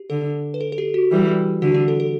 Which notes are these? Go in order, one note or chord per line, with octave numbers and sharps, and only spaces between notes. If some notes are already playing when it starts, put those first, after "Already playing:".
Already playing: G4
D3 A4
B4
A4
A4
G4
F#4
E3 G3
D3 F#4
G4
A4
A4